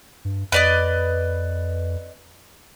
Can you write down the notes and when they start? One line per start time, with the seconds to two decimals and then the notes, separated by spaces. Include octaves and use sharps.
0.25 G2
0.52 F2 B4 D5 D#5